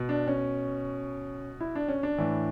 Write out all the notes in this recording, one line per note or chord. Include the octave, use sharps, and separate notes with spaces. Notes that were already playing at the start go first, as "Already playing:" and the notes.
Already playing: B2
D4
C#4
E4
D4
C#4
D4
A2 E3